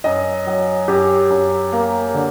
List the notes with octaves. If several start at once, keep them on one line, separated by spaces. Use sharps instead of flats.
F#2 D#5
F#3
F#2 G4
F#2
A#3
D3